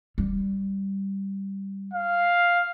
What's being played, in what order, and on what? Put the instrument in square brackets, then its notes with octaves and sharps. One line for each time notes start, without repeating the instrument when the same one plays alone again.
[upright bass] G3
[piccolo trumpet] F5